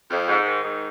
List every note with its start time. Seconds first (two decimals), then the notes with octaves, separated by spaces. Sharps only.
0.10 F2
0.28 G#2
0.46 D#3
0.64 G#2